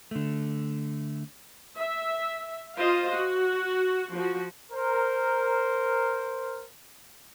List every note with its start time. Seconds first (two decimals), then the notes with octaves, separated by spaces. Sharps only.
0.11 D3 A3
1.76 E5
2.75 F4 C5 D#5 F5
3.13 F#4
4.14 F3 F#4
4.71 A#4 C5